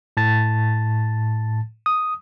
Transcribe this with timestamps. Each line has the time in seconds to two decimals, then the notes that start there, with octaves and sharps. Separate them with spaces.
0.17 A2 A5 A6
1.86 D#6